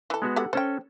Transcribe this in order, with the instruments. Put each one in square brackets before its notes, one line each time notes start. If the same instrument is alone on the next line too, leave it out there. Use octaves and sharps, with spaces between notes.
[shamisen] E3 A4
[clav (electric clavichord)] G#3 B3 F#4
[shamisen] G4 A4 F#5
[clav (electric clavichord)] C#4 A4 [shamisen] C5 G5